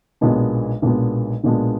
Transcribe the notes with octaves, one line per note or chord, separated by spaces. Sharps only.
B1 A#2 G#3 B3 D4
B1 A#2 G#3 B3 D4
B1 A#2 G#3 B3 D4